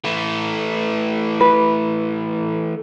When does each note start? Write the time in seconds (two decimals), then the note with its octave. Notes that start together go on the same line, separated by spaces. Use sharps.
0.05 E3 A3
1.41 B4